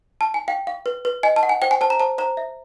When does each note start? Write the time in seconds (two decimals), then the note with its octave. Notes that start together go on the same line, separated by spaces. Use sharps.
0.21 A5
0.34 G#5
0.48 F5 G5
0.67 F5
0.86 B4
1.05 B4
1.23 D#5 G#5
1.36 A5
1.43 F#5
1.49 G#5
1.62 C5 G5
1.71 G#5
1.81 C5 A5
1.90 A#5
2.00 C5 A5
2.18 C5 A#5
2.37 E5